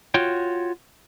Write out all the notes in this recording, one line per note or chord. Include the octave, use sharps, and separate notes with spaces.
F4 F#4 C#5 G5